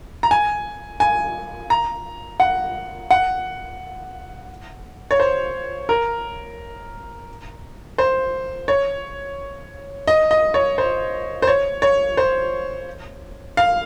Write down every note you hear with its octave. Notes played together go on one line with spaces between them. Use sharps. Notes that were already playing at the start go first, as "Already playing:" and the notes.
A#5
G#5
G#5
A#5
F#5
F#5
C#5
C5
A#4
C5
C#5
D#5
D#5
C#5
C5
C5
C#5
C#5
C5
F5